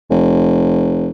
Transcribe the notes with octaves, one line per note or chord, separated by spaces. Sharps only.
F1